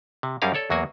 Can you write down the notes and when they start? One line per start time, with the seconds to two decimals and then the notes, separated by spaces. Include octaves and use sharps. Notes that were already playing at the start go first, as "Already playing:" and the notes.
0.23 C3
0.42 F#2 G3 C#4 G#4 A#4 F5
0.54 A4 C#5 D5
0.70 E2 F#3 A#3 F#4 G#5